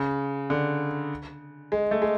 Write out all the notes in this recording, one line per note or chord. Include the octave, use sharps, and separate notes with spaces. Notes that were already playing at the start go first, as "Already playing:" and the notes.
Already playing: C#3
D3
G#3
A3
G#3